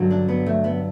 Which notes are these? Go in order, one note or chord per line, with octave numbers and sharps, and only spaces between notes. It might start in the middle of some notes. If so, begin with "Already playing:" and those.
Already playing: G2 D3 F#3
D4
B3
A3
B3